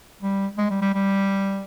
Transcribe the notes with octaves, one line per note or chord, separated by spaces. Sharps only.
G3
G#3
G3
G3
G3